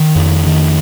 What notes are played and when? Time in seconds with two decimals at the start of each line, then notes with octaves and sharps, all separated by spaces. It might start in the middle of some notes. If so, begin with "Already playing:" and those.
Already playing: D#3
0.16 F2
0.46 D#3